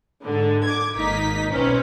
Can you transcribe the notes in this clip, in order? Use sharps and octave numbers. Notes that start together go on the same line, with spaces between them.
G#2 D3
D6 G#6
G#1 A#3 D#4 D#5 B6
B1 C4 C#4 B4